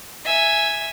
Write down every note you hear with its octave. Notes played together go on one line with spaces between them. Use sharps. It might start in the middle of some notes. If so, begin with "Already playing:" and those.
E5 G#5